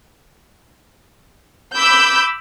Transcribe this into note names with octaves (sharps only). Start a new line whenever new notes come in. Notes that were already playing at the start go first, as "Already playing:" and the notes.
B5 D6 E6 G6